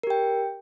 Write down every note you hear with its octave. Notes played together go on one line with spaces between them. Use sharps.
G4 A#4 G5